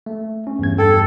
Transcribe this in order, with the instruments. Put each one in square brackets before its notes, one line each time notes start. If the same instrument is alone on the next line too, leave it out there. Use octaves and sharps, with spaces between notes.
[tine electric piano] A3
C#4
E2 G2 G#6
[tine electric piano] G2 G5 [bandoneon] A4